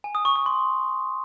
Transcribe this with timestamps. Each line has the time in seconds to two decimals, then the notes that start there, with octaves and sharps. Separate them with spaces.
0.04 G#5
0.15 D#6
0.25 C#6
0.36 C#6
0.46 C6